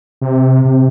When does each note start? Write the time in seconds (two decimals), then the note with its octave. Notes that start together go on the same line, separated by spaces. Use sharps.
0.21 C3
0.65 C3